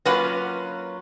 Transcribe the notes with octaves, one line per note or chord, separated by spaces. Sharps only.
F#3 A#3 C#4 F4 B4 F#5